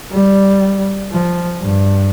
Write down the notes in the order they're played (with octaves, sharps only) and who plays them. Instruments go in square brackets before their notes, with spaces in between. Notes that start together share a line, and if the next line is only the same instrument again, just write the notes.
[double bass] G3
F3
G2